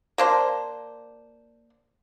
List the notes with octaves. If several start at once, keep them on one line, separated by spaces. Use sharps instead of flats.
A#3 D4 C5